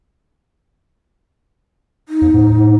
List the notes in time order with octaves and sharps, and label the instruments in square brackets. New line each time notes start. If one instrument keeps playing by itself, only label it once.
[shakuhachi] D#4
[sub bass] E2
A2